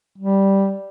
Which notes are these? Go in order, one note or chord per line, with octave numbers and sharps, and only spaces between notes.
G3